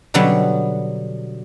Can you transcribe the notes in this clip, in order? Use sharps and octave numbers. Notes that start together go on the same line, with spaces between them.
B2 D3 F#3 G3 B3